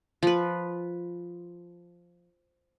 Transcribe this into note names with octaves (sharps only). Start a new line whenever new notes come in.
F3 B4